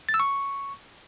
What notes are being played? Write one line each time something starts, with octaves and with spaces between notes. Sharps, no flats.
A6
E6
C#6